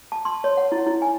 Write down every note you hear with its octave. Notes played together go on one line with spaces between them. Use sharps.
A5
C6
C#5
F#5
E4
E4
G#5